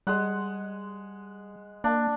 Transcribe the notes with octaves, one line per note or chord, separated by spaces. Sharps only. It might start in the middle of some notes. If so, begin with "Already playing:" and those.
G3 G#3 G#4 F#5
A#3 D4